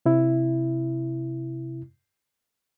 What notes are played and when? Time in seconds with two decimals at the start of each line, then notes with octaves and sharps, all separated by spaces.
0.06 C3 E4